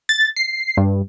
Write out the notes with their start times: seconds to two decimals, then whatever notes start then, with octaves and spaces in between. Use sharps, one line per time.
0.09 A6
0.36 C7
0.77 G2